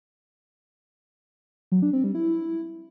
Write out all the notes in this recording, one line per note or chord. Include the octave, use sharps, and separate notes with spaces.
F#3
D4
C4
G3
E4